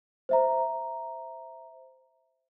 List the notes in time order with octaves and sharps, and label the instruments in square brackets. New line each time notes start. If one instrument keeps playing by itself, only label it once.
[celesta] C5 E5 A#5